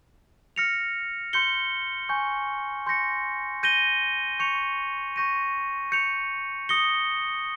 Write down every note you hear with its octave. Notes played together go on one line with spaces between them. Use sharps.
F6 A#6 C#7 F7
C6 G6 C#7 G7
G#5 C#6 G6
C6 G6 A#6 C#7
G6 A#6 D#7 G7
C#6 G6 C#7 F7
C#6 G6 A#6 D#7
G6 C#7 F7
D#6 A#6 C#7 G7